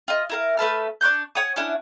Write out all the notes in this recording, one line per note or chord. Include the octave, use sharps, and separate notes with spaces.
F4 D#5
E4 A#4 F5
A3 B4 A5 F6
D4 C#6 F#6 G6
C#5 F#5 G#5 D#6
C#4 D4 E4 F#5